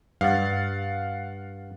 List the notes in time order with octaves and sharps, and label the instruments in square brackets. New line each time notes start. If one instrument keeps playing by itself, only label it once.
[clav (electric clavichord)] G2 [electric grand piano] F5 F#5 A6